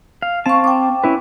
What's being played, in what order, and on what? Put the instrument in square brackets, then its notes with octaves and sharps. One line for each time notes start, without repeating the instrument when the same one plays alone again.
[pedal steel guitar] F5
[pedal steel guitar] C4 A5 [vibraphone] F5 C#6
[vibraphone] G5 D6
[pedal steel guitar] C#4 E4 B4